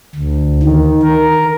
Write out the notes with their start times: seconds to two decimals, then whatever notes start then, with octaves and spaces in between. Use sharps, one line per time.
0.15 D2
0.62 D#3
1.02 A#4